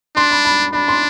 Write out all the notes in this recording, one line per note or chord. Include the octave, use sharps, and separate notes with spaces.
D4 C6
B5
B5
D4 B5
C6